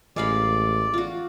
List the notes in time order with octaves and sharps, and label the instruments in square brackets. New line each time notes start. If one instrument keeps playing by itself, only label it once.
[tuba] A1 [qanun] G#3 F5 B5 [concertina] D5
[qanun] F4 F#4